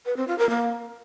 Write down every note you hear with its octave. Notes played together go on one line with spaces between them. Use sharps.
B4
C4
F4
A#4
A#3